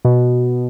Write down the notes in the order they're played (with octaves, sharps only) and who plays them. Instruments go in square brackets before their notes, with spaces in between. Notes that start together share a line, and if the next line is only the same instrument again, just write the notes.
[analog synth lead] B2